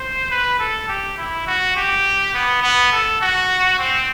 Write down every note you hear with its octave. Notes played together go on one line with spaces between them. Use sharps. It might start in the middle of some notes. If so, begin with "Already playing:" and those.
Already playing: C5
B4
A4
G4
E4
F#4
G4
B3
B3
A4
F#4
C4